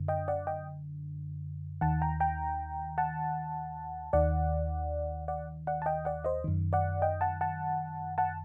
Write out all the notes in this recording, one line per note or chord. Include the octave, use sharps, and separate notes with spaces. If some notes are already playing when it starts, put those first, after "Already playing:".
Already playing: F#2 D3
D#5 G5
D5 F#5
D#5 G5
D#2 D#3 F#5 A5
G5 A#5
G5 A#5
F#5 A5
D#2 D#3 D5 F#5
D5 F#5
D5 F#5
A5
D#5 G5
D5 F#5
C5 D#5
F#2 D#3
D5 F#5
D#5 G5
F#5 A5
F#5 A5
F#5 A5